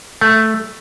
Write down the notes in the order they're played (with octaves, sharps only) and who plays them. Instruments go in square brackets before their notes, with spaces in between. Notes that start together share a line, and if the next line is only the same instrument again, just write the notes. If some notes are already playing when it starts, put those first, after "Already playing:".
[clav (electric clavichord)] A3